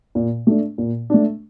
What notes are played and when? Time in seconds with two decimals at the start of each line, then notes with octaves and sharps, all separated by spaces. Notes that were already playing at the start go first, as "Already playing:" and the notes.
0.15 A#2
0.47 A3 D4
0.78 A#2
1.10 A3 D4